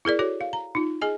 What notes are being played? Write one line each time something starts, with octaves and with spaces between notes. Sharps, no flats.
E4 G#4 A#4 D5
F#4 A4 C#5
F5
A#5
D#4 F4
G#4 D#5 G#5